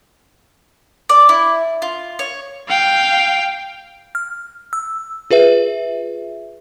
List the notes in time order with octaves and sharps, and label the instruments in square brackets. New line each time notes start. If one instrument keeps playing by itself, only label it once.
[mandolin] D5
E4
F4
C#5
[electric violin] F5 G5
[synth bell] F6
E6
F4 G#4 B4 E5